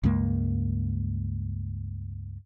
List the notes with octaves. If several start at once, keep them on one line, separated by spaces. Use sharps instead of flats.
C#2 G2 G#3 A#3